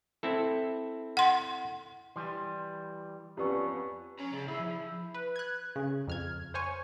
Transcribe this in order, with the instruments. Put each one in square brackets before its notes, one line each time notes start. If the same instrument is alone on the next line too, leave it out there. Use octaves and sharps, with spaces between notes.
[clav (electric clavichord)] C4 E4 A4
[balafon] F#5 C6
[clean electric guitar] E3 G3 [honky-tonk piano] C6
[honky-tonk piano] F2 B3 C#4 [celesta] G4 D5 C#6
[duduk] C#4 [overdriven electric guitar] C#5 A#5
[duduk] C#3 [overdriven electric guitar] G#4 D5
[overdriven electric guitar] D#3 G#4 [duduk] E4
[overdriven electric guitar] F3
[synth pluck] B4
F#6 G#6
C#3
F2 F6 G#6
C5 C#5 G#5 C#6